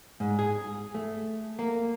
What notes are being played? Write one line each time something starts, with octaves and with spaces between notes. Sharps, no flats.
G#2
G#4
A3
A#3